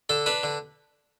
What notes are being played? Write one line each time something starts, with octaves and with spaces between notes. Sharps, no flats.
D3 A4
D4 B4
D3